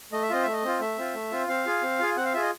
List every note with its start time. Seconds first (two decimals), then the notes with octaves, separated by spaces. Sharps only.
0.12 A3 D#5
0.22 E5
0.30 C4 F4 D#5
0.43 A3 E5
0.53 D#5
0.64 C4 F4
0.80 A3 E5
0.98 C4 F4
1.14 A3
1.31 C4 F4
1.48 C4 F5
1.65 F4 G#4
1.83 C4
1.99 F4 G#4
2.17 C4 F#5
2.25 F5
2.34 F4 G#4 E5
2.42 D#5